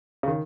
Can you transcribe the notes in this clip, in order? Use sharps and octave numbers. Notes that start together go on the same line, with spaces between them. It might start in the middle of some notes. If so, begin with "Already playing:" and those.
C#3
D#3